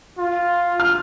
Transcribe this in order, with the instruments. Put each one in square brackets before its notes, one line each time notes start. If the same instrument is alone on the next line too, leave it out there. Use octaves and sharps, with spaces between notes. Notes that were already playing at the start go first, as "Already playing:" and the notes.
[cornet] F4
[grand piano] F6